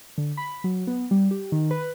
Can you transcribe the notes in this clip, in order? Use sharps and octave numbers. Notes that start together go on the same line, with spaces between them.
D3
B5
F#3
B3
G3
G4
D#3
B4